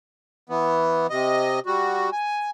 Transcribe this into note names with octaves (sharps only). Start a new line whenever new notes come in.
E3 B3
C3 D#5
G3 F#4
G#5